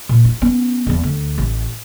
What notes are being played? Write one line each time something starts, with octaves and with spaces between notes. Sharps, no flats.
A#2
F4
B3 C#4
D1 E2
D2
A1